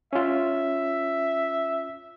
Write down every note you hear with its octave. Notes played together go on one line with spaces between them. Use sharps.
C#4 F4 E5